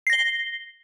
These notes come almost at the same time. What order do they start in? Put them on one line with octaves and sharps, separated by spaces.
C7 A#6 G7